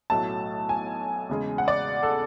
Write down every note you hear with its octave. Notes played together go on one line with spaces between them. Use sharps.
B1 A2 F#3 A3 A5
G#5
E2 C#3 G#3
F#5
D5
A4